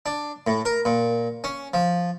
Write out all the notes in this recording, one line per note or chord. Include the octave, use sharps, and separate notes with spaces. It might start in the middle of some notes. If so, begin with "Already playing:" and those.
D4
A2
A#4
A#2
C#4
F3